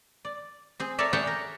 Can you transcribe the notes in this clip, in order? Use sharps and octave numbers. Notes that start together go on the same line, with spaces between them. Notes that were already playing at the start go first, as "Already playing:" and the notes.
D5
C4 G#4
A4 A#4 C#5 D5 E5
G#4 C#5 D5 E5 F#5 G5
A#4